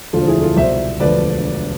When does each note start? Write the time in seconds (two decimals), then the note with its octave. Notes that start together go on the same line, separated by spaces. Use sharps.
0.13 E1 D2 D3 F3 F4 A4
0.28 E4 G#4
0.42 F4 A4
0.56 C2 B2 C5 E5
1.00 E1 D2 D3 F3 B4 D5